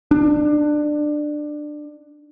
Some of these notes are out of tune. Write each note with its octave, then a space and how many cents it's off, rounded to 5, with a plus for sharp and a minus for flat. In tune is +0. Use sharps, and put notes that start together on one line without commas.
D4 +20